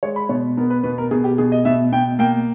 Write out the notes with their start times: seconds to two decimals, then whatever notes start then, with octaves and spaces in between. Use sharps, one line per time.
0.03 G#3 C#5
0.16 B5
0.29 B2 C#5
0.57 B3 A#4
0.70 B4
0.83 B2 B4
0.98 A#4
1.11 B2 G#4
1.24 G4
1.38 B2 G#4
1.52 D#5
1.65 B2 E5
1.92 B2 G5
2.19 A#3 G5